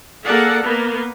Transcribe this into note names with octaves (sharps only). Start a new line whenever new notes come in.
A#3 G#4 A4 D5 F#5
A#3 B3